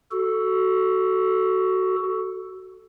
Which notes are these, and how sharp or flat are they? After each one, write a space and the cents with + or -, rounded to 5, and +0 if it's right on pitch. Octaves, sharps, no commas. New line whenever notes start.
F#4 +15 A4 +0